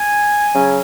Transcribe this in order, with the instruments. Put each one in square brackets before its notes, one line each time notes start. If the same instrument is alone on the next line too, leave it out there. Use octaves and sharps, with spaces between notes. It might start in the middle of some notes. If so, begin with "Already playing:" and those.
Already playing: [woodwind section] G#5
C#3 F#3 C#4